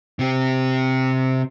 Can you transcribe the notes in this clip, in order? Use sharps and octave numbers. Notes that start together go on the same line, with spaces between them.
C3 G4